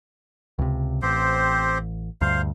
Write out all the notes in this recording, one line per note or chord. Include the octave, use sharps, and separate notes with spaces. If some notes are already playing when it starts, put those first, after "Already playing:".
C#2 C3
A1 C4 G4 C5
D2 G2 C5 F5